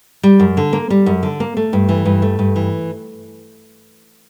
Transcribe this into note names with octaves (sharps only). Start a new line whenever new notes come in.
G3
F#2
D3
A#3
G3
F#2
D3
A#3
A3
G2
E3
G2
A3
G2
E3